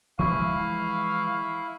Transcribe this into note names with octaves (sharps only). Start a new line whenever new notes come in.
E3 F3 G#3 E4 F5 C#6